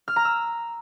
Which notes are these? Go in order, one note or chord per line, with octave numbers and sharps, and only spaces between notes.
F6
A#5
E6